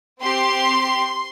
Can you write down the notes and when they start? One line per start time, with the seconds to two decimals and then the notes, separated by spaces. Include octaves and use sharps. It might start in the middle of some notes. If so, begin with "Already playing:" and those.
0.22 C4 G4 C6